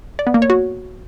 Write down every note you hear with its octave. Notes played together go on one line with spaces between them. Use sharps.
D5
B3
A#3
C#5
F#4